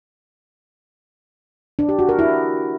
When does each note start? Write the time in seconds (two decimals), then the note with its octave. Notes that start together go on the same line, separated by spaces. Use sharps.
1.79 D4
1.89 G4
1.99 F#4
2.09 A#4
2.19 E4